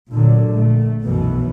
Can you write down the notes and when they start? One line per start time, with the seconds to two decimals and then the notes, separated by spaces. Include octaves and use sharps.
0.11 A#2 D3 F#3
0.51 A#1 A3
1.02 B1 F#2 B2 E3 B3